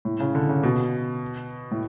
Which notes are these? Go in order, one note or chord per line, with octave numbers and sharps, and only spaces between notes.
A2
C#3
D3
C#3
B2
A2